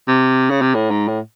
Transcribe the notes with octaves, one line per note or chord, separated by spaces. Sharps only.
C3
C#3
C3
A2
G#2
A2